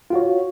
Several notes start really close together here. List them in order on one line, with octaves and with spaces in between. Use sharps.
F4 F#4 C#5